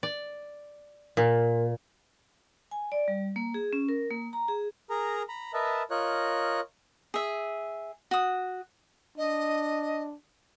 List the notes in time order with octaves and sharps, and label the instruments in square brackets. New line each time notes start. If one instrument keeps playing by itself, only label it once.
[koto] D5
A#2
[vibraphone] G#5
D5
G3
A#3
G#4
C#4
A#4
A#3
A#5
G#4
[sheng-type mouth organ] G#4 A#4 A#5
A#5 B5
A#4 B4 D#5 E5 A5
F4 A#4 C#5 D#5 F#6
[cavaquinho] G#4 E5
F#4 D#6
[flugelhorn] D4 [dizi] D#5